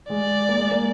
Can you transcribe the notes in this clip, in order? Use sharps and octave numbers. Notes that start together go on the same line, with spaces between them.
G#3 D5
A#3
G#3
A#3